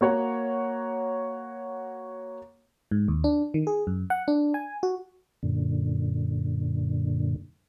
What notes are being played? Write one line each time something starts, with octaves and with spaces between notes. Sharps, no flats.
A#3 F#4 C#5 F#5
G#2
D#2
D4
D#3
G#4
F#2
F#5
D4
G#5
F#4
F#2 A#2 D3